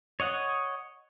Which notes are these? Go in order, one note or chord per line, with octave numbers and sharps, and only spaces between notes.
C#5 D#5 F#5